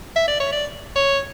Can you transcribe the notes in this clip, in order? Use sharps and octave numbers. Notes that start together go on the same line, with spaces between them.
E5
D5
C#5
D5
C#5